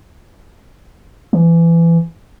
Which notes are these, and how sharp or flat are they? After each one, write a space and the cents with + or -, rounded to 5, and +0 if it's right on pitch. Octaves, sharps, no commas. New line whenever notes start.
E3 +25